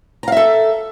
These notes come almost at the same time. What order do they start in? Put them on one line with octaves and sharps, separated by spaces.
A#5 F5 E5 A4